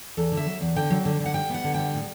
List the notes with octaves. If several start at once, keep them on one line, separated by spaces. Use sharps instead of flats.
E2 A4
D3
E5
F#3
E2
D3 G5
F#3
D3
D3
F#5
G3 G5
B3 F#5
D3
G3 G5
A2